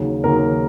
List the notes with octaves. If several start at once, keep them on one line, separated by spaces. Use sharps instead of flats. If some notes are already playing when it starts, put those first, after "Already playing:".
Already playing: D#2 C#3 F#3
D#2 C#3 F#3 A#4